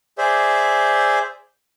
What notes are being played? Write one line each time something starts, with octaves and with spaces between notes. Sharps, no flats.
G#4 C5 D5 E5